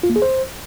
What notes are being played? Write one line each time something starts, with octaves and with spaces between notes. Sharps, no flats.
F4
A#3
G#4
C5